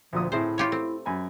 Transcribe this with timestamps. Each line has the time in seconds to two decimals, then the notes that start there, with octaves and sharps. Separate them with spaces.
0.13 D2 A#2 F3 D#6
0.32 A2 C4 E4 G#4 C5
0.58 F4 G4 C#5
0.72 A3 C4
1.06 F#2 G#5 B5